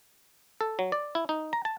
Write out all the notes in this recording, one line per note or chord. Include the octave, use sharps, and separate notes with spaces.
A4
F#3
D5
E4
D#4
A#5
A5